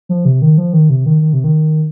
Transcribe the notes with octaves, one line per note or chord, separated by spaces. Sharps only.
F3
C3
D#3
F3
D#3
C3
D#3
D#3
C3
D#3